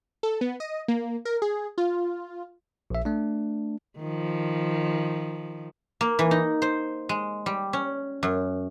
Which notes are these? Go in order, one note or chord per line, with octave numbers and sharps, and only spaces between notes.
A4
B3
D#5
A#3
A#4
G#4
F4
A#1 E5
A3 D4
D#3 F3
A#3
E3
D#4
C5
G#3
G3
C#4
F#2